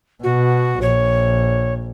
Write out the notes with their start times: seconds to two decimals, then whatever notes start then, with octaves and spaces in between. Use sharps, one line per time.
0.23 B2 F#4
0.82 A#1 C#5